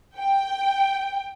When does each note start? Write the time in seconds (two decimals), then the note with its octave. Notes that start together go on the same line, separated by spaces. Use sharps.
0.17 G5